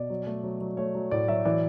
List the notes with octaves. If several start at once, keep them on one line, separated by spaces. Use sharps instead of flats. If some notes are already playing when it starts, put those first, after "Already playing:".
Already playing: B2 D5
F#3
A3
F#3
F#3
A3 C#5
F#3
A2 D5
F#3 E5
E3 D5